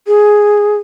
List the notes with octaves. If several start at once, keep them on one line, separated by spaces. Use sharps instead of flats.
G#4